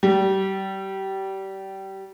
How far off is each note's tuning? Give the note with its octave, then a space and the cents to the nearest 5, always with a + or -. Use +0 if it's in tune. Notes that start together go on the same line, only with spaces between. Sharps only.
G3 -25